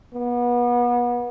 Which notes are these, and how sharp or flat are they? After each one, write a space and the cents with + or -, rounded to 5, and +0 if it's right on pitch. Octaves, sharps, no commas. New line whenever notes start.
B3 -30